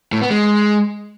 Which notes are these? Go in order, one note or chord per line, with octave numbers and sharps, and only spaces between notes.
A2
B3
G#3